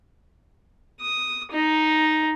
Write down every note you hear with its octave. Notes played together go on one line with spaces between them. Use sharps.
D#6
D#4